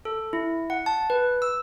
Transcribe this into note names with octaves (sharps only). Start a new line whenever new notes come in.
A4
E4
F#5
A5
B4
E6